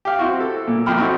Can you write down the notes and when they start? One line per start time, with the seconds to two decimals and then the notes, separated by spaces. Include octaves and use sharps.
0.05 G4 F5
0.19 C4 E4 F#4
0.40 A4
0.67 A#2
0.86 A#1 F2 G5 B5 F6
0.99 C4 D#4 E4 F#4 A4